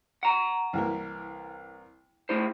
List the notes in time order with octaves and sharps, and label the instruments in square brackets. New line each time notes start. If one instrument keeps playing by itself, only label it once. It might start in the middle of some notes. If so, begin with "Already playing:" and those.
[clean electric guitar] F#5 A#5
[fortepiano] C2 E3 A#3
[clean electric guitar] A3 E4 C5